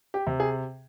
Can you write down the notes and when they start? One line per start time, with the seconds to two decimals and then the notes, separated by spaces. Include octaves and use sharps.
0.14 G4
0.27 C3
0.40 G#4